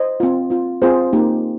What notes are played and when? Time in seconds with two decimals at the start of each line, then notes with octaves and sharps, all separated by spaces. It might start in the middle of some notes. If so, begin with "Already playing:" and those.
Already playing: C5 D#5
0.20 C4 F4
0.50 C4 F4
0.82 C4 F4 G#4 C5
1.13 A#3 D#4 G4